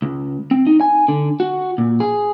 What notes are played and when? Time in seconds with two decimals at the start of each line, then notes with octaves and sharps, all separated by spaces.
0.02 C#2
0.51 C4
0.67 D#4
0.81 G#5
1.08 D3
1.40 F#4
1.78 A#2
2.00 G#4